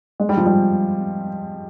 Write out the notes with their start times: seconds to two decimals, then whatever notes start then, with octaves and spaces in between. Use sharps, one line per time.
0.20 G#3
0.29 G3
0.37 F3
0.46 G3